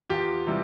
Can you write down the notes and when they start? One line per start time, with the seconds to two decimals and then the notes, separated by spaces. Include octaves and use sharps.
0.09 E2 F4 G4
0.47 C3 E3 G3